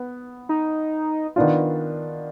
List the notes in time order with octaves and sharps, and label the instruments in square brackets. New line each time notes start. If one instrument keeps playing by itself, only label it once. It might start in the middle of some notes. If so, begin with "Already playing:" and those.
Already playing: [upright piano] B3
[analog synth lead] D#4
[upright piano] D#3 B3 D4 F4